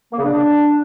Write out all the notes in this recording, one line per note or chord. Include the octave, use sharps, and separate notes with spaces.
A#3
C#3
D4